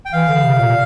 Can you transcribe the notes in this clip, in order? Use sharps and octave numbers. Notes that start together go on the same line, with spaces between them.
G5
E3 F5
D3
C3
A#2